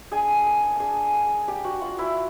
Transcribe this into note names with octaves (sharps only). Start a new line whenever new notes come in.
D4 G#4 G#5
A#3
D4 G#4 G#5 A5
A#3
D4 G4 G5
F#4 F#5
F4 F#4 F#5
E4 E5